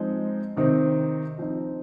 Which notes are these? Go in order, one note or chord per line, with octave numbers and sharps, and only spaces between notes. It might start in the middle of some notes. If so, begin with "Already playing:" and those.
Already playing: F3 G#3 C4 D#4
C3 D#3 C4 D#4
F3 C4 D#4